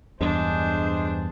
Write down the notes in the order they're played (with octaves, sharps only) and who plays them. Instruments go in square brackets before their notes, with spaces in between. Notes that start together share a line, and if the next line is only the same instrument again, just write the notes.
[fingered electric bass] E2 G2 [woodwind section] G#3 G#4 C5 [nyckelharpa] D4